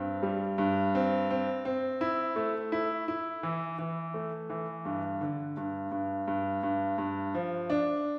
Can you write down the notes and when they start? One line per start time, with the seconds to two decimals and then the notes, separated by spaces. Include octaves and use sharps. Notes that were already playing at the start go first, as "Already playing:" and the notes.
Already playing: G2 C4
0.23 G3
0.58 G2
0.95 C4
1.30 C4
1.65 C4
2.01 E4
2.36 A3
2.72 E4
3.08 E4
3.43 E3
3.79 E3
4.14 A3
4.50 E3
4.85 G2
5.21 D3
5.57 G2
5.91 G2
6.28 G2
6.63 G2
6.98 G2
7.34 F3
7.70 D4